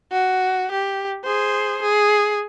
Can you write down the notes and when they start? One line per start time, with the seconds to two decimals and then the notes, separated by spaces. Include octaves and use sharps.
0.12 F#4
0.71 G4
1.24 G#4 C5
1.82 G#4